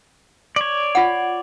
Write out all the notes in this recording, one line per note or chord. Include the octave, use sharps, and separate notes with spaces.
C#5 D5
F4 F#5